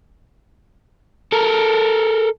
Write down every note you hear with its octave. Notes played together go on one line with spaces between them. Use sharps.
A4 A#4